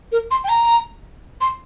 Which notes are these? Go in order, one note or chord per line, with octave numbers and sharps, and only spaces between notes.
A#4
C6
G5
A#5
C6